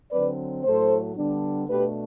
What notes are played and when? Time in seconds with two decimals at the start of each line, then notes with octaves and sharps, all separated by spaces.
0.11 D3 F#3 C4 B4 D5
0.64 A2 F#3 A3 A4 C5
1.16 D3 G3 B3 D4
1.69 B2 A3 D4 G4 B4